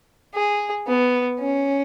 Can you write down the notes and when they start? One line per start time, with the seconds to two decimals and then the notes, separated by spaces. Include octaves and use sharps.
0.34 G#4
0.87 B3
1.39 C#4